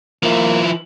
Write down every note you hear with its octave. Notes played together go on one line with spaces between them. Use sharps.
F3 A#3 E4